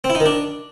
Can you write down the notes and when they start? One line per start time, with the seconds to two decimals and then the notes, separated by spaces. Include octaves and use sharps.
0.04 C4
0.10 E4
0.15 D#4
0.20 D#3
0.26 D4